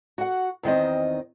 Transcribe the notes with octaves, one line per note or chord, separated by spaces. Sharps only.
F#4 F#5
E2 D#3 C4 D#5